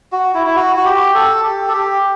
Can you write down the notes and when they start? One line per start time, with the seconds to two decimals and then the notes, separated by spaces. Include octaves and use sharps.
0.12 F#4
0.34 E4
0.47 E4
0.56 F#4
0.76 F#4
0.85 G4
1.14 A4
1.43 G4
1.68 A4
1.73 G4